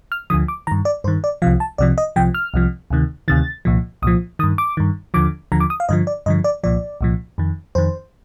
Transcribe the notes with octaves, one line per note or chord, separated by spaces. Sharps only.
F6
D2 D3 F3 D#6
D6
G2 D#3 A#5
D5
G2 D#3 C5
D5
C2 C3 F3 F5
A5
C2 C3 F3 D5
D#5
C2 C3 F3 G5
F6
C2 C3 F3
D2 C3 D#3
D2 C3 D#3 A6
C2 A#2 F3
C2 A#2 F3 D#6
G2 D#3 D#6
D6
G2 D#3
D#2 D3 F3 D6
D#2 D3 F3 A#5
D6
D#6
F5
G2 D3 F3 D#5
D5
G2 D3 F3 D#5
D5
C2 A#2 F3 D5
C2 A#2 F3
F2 D#3
F2 D#3 C5